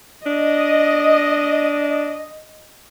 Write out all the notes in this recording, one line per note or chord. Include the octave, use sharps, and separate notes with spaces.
D4 D#5